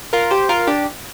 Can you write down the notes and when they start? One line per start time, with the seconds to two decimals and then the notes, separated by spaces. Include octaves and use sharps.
0.13 F4 A#4
0.31 G4 C5
0.49 F4 A#4
0.67 D4 G4